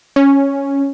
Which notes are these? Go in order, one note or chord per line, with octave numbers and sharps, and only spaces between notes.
C#4